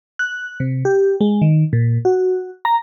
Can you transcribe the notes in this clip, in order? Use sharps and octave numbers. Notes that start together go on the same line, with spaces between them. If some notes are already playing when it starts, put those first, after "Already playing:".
F#6
C3
G4
G#3
D#3
A#2
F#4
A#5